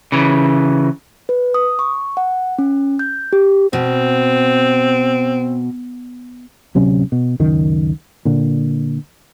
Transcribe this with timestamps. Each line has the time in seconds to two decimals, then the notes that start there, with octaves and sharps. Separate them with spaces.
0.12 C#3 E3
1.29 B4
1.54 D#6
1.79 C#6
2.17 F#5
2.59 C#4
2.99 G6
3.33 G4
3.73 B2 C4
6.75 D1 C3 F#3 C#4
7.12 B2
7.40 C#2 F#2 D#3
8.25 A#2 D3